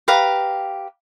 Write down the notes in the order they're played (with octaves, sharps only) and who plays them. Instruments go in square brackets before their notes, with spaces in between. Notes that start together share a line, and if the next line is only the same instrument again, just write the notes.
[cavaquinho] G4 B4 F5 A#5